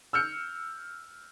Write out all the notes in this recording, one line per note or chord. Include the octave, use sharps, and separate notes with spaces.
E6 F6 G6 C#7